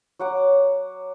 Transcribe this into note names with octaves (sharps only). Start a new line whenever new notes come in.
F#3 F#5 D6